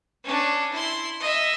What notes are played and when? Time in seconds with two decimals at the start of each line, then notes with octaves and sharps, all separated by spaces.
0.24 C#4 D4
0.73 E4 C6
1.20 D#5 E5